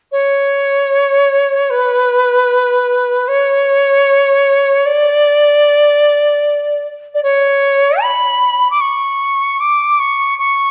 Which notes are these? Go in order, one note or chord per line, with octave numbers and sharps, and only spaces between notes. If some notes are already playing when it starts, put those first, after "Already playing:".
C#5
B4
C#5
D5
D5
C#5
B5
D6
C#6
D6
C#6
C#6